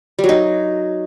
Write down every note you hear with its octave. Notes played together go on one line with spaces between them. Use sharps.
G3
F#3
D#4